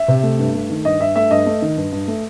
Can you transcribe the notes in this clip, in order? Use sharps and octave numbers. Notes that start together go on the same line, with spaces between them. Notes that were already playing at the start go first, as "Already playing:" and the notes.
Already playing: E5
C3
A3
G2
A3
D#3
G2 D#5
G2 E5
A3 E5
G2 D#5
A3
D#3
G2
G2
A3